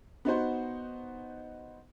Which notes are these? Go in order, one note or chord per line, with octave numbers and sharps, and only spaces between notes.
B3 D#4 F#4 C5